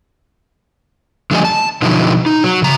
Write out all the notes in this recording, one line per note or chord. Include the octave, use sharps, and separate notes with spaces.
D3 F3 G3 A3 D#5 G#5
A5
B2 D3 F3 F#3 D#4 E4
D#4
F#3
C#3 A#5